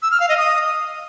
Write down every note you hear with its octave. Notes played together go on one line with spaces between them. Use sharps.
E6
F6
F5
D#5
D#6